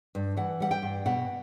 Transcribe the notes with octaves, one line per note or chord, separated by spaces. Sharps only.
G2
E3 F#5
G3 F#5
G5
G2
B2 F#5